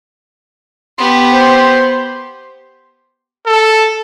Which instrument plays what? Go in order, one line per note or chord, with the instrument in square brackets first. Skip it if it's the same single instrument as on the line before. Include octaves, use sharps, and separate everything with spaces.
[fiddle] B3 G4 [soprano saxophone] C6
[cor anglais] C5
[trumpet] A4